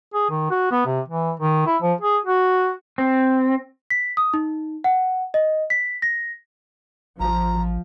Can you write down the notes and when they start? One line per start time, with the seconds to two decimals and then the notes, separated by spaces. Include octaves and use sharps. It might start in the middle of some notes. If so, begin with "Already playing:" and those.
0.14 G#4
0.30 D#3
0.50 F#4
0.71 B3
0.86 C3
1.09 E3
1.40 D#3
1.66 E4
1.82 F3
2.01 G#4
2.25 F#4
2.98 C4
3.90 B6
4.17 D#6
4.34 D#4
4.84 F#5
5.34 D#5
5.70 B6
6.02 A#6
7.20 A1 F3 A#5